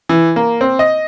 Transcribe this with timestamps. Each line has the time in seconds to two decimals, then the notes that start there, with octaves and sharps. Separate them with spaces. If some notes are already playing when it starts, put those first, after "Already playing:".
0.09 E3
0.36 A#3
0.61 C4
0.79 D#5